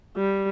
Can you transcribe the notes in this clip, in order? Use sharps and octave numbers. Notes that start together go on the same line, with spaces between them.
G3